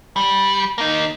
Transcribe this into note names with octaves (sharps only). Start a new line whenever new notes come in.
G3
A#3 D#4